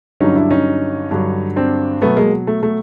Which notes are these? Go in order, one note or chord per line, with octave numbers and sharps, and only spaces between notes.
G2 D3 F#3 C#4 D#4
D4 E4
C#4 D#4
G2 D3 F#3
C4 D4
B2 F#3 A3 B3
G#3 A#3
A3
A3